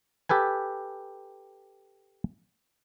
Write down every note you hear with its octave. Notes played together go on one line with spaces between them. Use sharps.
G4 A4 B4 G#5